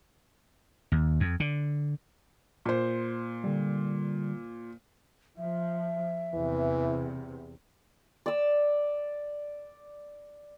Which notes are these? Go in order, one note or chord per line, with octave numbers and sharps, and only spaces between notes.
D#2
F2
D3
A#2 C5
D3 G3
F3 E5
E2 C3 E3
D5 E6